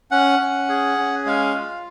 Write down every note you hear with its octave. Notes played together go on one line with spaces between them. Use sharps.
C#4 F#5
C#4
G#4
C#4
G#3 F5
F4